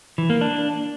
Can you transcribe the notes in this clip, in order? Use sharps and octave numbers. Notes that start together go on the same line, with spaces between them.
E3
A#3
D4